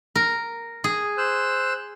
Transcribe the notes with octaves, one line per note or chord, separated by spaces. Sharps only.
A#4
G#4
C5 E6 F#6